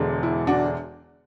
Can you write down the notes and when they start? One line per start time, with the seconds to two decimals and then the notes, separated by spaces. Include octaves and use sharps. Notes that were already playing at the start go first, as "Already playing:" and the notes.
Already playing: E1 E2 D3 G#3 D4
0.23 E4
0.47 D4 F#4